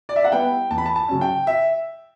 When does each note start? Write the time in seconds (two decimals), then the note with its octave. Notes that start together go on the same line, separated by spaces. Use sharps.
0.09 D5
0.16 E5
0.24 F#5
0.32 G3 B3 E4 G5
0.70 E2 A5
0.78 B5
0.86 A5
0.96 A5
1.09 C#3 F#3 C#4
1.21 G5
1.47 E5